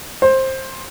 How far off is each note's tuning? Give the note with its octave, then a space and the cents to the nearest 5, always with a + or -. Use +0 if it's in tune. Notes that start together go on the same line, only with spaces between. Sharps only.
C5 +15